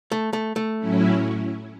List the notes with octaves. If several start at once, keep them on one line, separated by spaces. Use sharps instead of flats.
A3
A3
A3
A2 F#3 C#4 E4